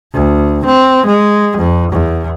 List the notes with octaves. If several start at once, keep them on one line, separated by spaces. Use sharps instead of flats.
D2
C4
G#3
F2
E2